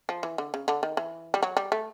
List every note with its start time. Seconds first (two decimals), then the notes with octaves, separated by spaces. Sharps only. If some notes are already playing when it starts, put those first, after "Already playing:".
0.09 F3
0.23 E3
0.38 D3
0.54 C#3
0.68 D3
0.83 D#3
0.97 E3
1.34 G3
1.43 F#3
1.57 G3
1.72 A3